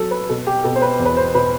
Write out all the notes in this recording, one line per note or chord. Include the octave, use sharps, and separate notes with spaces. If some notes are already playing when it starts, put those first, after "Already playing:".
Already playing: F#3 A4
B4
B2 A4
G4
B2 A4
C5
B4
E2
B4
C5
B2 B4